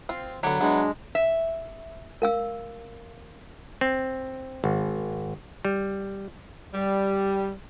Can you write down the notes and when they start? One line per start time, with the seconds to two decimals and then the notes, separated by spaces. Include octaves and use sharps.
0.09 C4 F4
0.43 D3 F#3 B3 G4
0.61 E3 G#3 B3 D4
1.15 E5
2.22 A#4 F5 E6
3.81 C4
4.64 G#1
5.65 G3
6.74 G3